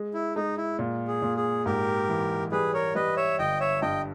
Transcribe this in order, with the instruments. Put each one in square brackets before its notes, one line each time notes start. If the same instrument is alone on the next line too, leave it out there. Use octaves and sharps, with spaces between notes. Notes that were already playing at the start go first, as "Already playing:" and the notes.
Already playing: [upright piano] G#3
[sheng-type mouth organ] E4
[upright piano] G#3 [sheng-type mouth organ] D#4
[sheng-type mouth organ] E4
[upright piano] A#2
[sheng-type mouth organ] G#4
[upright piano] A#2
[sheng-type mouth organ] G#4
[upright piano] G#2 [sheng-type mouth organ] G4 A#4
[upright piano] E3
[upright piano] G3 [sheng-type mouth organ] G#4 B4
[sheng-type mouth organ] A#4 C#5
[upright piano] G3 [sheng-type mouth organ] B4 D#5
[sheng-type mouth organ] C#5 E5
[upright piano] G1 [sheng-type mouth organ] D#5 G5
[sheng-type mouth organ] C#5 E5
[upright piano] G2 [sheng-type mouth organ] D#5 G5